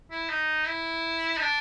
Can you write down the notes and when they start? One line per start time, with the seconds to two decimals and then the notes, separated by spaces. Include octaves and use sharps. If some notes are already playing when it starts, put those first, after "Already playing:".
0.11 E4
0.29 D#4
0.67 E4
1.37 D#4
1.41 D4